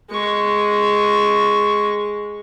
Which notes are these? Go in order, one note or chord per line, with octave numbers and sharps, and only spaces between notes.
G#3 C#6